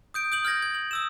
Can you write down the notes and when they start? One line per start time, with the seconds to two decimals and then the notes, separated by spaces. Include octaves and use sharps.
0.14 D#6 G6 D7
0.32 D#6 G6 F#7
0.45 F6 G6 G#6 A#6 F#7
0.62 G#6
0.75 F#7
0.91 D#6 E6 E7